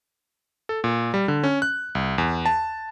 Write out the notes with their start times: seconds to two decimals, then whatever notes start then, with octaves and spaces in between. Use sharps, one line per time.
0.69 A4
0.84 A#2
1.14 G3
1.28 D3
1.44 C#4
1.62 F#6
1.95 C2
2.18 E2
2.46 A5